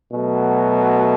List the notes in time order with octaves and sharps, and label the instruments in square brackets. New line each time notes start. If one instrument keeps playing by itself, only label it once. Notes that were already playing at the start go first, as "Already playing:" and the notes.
[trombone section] B2 F#3 A3